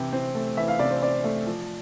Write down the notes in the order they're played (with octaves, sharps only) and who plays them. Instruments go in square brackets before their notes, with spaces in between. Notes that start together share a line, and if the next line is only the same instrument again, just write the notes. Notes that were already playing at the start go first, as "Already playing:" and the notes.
Already playing: [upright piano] C3 E3 G5
C4
A3
E3 E5
F5
C3 D5
C5
C4 D5
A3
F3